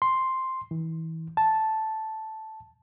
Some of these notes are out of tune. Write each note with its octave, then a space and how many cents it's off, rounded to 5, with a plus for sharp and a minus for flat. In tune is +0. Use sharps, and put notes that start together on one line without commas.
C6 +0
E3 -30
A5 -5